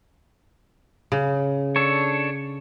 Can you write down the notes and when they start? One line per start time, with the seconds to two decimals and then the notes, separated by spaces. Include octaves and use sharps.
1.12 C#3
1.76 D4 A4 C#5